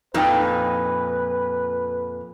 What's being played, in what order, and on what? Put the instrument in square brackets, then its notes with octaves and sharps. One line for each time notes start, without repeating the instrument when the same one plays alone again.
[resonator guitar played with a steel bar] F2 A#2 D#4 [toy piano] E4 G5 [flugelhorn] B4